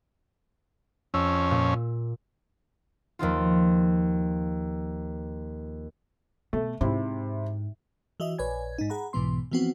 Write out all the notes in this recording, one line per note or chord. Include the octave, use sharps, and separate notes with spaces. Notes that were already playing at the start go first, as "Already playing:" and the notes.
F2 C#4 E6
A#2
D#2 F3 D#4 F4
B2 A3
G#2 C3 E4
E3 F#4 D#5 E5
A#1 B4 C#5 D5 G#5 G#6
G#2 D#4
G#4 F#5 A#5 B5
B1 G#2 B2 E3 B3 C6
E3 F3 B3 C4 F#4